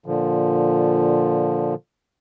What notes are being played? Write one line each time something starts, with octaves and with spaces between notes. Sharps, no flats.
A#2 D3 F3